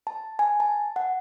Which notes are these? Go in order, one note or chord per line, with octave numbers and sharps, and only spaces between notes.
A5
G#5
A5
F#5